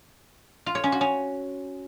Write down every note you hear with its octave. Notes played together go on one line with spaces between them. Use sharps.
F4
C#5
C#4
F#4
C#4